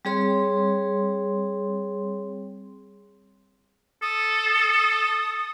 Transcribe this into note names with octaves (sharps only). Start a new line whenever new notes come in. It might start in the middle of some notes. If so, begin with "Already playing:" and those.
G3 C4 G#4 C#5 C6
A4 D#6